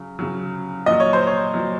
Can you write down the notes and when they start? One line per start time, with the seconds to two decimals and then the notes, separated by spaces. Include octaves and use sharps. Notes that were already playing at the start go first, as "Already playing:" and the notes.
Already playing: C#3 F#3
0.19 C#3 F#3
0.86 A#2 F#3 D#5
1.00 C#5
1.13 C5
1.27 C#5
1.54 A#2 F#3